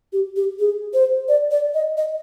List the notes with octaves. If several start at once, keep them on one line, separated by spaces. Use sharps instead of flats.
G4
G4
G#4
C5
D5
D5
D#5
D#5